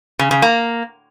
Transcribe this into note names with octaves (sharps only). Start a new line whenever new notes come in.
C#3
C#3
A#3